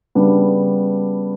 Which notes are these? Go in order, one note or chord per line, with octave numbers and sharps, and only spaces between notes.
C#3 G3 B3 D4